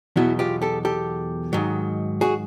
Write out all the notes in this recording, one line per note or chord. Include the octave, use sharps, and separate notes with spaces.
E2 B2 F#3 E4 F#4
F4 G4
G4 A4
G4 A4
G#2 D#3 F#3
F#4 G#4